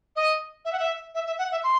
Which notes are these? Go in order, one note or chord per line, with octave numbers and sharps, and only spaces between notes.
D#5
E5
F#5
E5
E5
E5
F#5
E5
C6